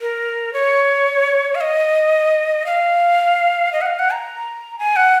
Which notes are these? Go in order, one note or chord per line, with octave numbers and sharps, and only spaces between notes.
A#4
C#5
F5
D#5
F5
D#5
F#5
F5
F#5
A#5
G#5
F#5